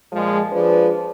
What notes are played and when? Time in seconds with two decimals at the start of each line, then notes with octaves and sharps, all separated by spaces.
0.12 A#2 F3 G#3
0.51 F3 D4 G#4 B4